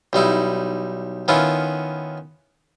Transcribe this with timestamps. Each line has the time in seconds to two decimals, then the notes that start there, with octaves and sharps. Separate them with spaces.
0.13 B1 G3 D#4 E4
1.28 D#3 B3 C#4 E4 F4